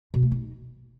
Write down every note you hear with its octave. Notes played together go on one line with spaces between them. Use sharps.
B2
A3
D#4